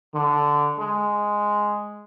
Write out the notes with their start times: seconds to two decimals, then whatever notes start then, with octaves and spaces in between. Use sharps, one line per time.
0.14 D3
0.79 G#3